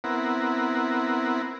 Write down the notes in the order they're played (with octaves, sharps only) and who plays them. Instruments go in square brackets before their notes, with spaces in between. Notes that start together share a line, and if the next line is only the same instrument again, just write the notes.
[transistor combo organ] B3 C4 E4 A#4 F#5